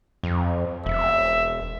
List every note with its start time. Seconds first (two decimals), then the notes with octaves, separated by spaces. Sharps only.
0.23 F2
0.86 E1 E5